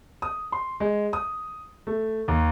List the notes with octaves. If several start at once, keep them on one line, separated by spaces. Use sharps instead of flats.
D#6
C6
G#3
D#6
A3
D#2